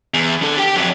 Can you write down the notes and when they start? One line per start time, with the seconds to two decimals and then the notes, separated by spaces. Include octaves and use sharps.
0.14 E2
0.42 D4 A4
0.58 G4 G5
0.75 F2 F#3